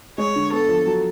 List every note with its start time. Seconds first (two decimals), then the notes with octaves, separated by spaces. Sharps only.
0.18 G#3 C#5
0.36 D3
0.52 B3 A4
0.69 F3
0.87 F#3